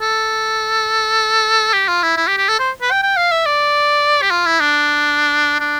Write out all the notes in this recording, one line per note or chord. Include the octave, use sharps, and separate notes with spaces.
A4
G4
F4
E4
E4
G4
G4
A4
C5
B4
G5
G5
F5
E5
D5
G4
F4
E4
D4
D4